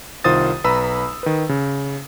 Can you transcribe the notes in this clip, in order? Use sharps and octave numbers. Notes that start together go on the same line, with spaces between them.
C2 D#3 F4 C5 D#6 A6
B1 B4 A#5 B5 E6
D#3 B4
C#3